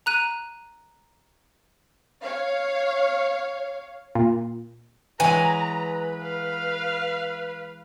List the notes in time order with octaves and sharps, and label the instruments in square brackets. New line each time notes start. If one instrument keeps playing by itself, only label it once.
[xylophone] A#5 F#6 D#7
[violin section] C#5 F5
[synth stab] A#2
[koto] E3 F#3 G#3 [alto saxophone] B4 [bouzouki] G#5 [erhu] A#5
[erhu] F5